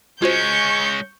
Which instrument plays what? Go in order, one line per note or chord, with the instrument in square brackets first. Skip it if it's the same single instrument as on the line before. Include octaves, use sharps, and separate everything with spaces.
[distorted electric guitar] G#3 C#4 [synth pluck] F4 F#4 C5 [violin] C#6 G6